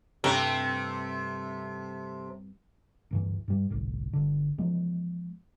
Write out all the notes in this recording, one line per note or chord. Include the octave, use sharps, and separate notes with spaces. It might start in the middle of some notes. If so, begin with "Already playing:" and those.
G2 C3 A3 C4
D1 G2 E3
G2 G3
G1 C2 A2
G1 D3
E3 F3 G#3 B3